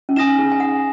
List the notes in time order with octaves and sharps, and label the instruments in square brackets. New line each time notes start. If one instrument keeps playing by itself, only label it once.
[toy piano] C#4
[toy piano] D#4 [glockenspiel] G#5 D#6 A#6 E7
[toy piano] G#4
G#5
F#5